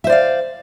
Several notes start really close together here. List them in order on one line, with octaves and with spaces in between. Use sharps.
E5 C5 D5 F5